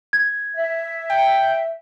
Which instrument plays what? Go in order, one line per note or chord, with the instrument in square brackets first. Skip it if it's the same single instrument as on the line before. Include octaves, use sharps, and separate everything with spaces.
[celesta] G#6
[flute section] E5
[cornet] G5